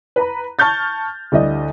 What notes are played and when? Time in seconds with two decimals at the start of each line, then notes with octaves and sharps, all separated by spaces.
0.16 B4 A#5 B5
0.59 A5 C#6 F6 G6 A6
1.32 D2 D3 G3 D4 E4 D#5